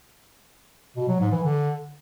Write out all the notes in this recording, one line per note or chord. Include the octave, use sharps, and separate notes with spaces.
B2
F#3
G#2
E3
D3